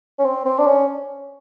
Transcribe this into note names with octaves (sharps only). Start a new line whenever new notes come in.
C#4
C4
C4
D4
C#4